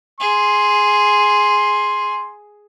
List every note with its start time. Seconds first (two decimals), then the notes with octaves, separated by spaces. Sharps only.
0.20 G#4 C6